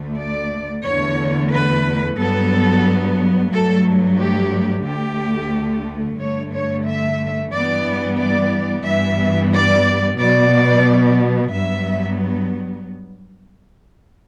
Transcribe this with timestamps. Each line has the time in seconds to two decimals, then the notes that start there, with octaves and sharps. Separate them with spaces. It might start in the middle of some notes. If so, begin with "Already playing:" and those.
Already playing: D2 D3 A3
0.18 D5
0.85 E2 D3 A3 C#5
1.51 B4
2.18 G2 F#3 B3 A4
3.52 G2 F#3 A3 A4
4.19 G4
4.85 D2 D3 A3 G4
6.18 G2 D3 A3 C#5
6.51 C#5
6.85 E5
7.51 G2 E3 G3 B3 D5
8.19 D5
8.85 G2 E3 G3 B3 E5
9.51 D5
10.18 B2 F#3 B3 D5
11.51 G2 F#3 B3 E5